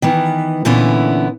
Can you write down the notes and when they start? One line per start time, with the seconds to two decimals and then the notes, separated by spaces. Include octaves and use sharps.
0.02 D#3 E3 B3
0.65 A#2 D3 E3 B3 C#4 E4